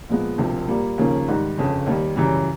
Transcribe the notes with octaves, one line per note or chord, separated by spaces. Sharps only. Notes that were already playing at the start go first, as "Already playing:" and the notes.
A#2 F3 G#3 B3
E1 D2 C3 F3
A#2 G3 A#3
D#2 C#3 F3 A#3 C#4
G#2 D#3 G3
G1 F2 C#3
D#2 D#3 G3
F#2 C#3 E3 G3